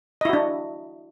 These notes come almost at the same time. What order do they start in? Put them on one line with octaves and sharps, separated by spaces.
D#5 E4 F#4 D4